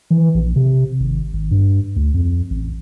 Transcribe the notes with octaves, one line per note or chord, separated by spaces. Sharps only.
E3
A#1
C3
G#1
G#1
G2
D2
F2
A1